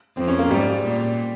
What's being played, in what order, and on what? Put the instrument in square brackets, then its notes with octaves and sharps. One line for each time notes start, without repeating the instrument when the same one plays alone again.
[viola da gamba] F2 [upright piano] C4
[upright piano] C#4
A#3
[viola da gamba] G#2 [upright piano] G3
[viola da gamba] A#2